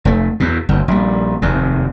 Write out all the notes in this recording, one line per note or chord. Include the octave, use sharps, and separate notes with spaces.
F1 A3
E2 B2
G1 D2
A#1 G3
F1 D#2 C3